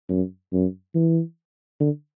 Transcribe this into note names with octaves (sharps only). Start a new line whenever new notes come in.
F#2
F#2
E3
D3